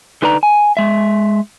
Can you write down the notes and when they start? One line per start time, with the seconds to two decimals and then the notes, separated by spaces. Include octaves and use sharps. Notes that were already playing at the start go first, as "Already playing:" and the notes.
0.22 D3 D#4 B4 D5 A#5
0.43 G#5
0.77 G#3 E5